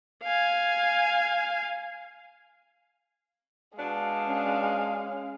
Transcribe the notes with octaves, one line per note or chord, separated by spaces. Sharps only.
F5 G#5
B2 G#3 D4 F5
C#4